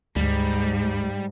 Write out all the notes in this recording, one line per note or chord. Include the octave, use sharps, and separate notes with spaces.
D2 G#2 G3